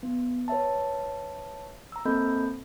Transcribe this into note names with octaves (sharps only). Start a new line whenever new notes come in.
B3
B4 C#5 E5 A5
A#5 E6
A#3 C4 A4 D#5 B5 G6